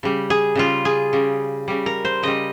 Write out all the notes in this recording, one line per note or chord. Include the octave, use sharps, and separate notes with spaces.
C#3 G3
G#4
C#3 G3 F4
G#4
C#3 G3
C#3 G3
A#4
C5
C#3 G3 D#5